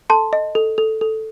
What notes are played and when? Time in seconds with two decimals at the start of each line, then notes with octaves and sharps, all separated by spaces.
0.10 A4 A5 C6
0.33 D#5
0.55 A4
0.78 A4
1.01 A4